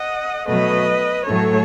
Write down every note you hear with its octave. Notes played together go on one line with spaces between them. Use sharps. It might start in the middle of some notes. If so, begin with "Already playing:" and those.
Already playing: D#5 F#5
B2 F#3 A3 B4 D#5
A2 F#3 A3 A4 C#5